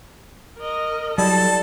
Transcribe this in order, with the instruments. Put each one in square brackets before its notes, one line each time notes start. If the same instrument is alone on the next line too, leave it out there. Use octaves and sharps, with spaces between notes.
[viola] A#4 D#5
[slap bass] F#3 [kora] G3 E4 [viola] A4 [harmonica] A5